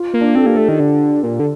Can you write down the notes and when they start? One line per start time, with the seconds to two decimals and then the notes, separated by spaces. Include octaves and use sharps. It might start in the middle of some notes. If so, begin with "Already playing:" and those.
Already playing: F4
0.14 A#3
0.21 D4
0.35 C4 A4
0.44 A#3 G4
0.53 A3 A4
0.69 D#3
0.80 D3
1.23 A#2
1.40 D3